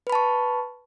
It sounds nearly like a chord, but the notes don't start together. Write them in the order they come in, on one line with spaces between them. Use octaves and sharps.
B4 B5 A5 C#6